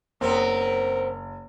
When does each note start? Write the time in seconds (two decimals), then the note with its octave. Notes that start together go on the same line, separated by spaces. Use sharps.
0.21 F#1 B3 C4 A#4